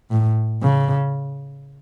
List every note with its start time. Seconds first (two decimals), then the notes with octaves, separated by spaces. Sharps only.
0.11 A2
0.62 C#3